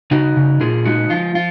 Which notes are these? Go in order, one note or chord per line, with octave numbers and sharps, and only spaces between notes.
C#3 D#4 F#4
C#3
A#2 F4 G#4
G#3 D#4 F#4
F3 F4
F4